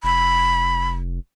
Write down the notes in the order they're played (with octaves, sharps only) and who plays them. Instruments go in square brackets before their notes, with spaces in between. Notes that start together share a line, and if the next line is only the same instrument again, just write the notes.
[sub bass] F1 [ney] B5